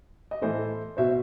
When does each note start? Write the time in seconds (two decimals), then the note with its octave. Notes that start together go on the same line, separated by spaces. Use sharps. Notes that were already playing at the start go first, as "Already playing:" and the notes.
0.31 D#5
0.42 A2 E3 A4 C5
0.97 B2 C5 E5